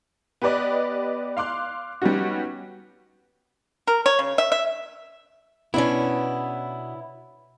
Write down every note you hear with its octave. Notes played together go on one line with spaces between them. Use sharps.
B3 G4 B4 D5 D#5
F5 C6 D6 F#6
G3 B3 C#4 D#4 F#4
A#4
C#5
C#3
E5
E5
B2 B3 C#4 D4 E4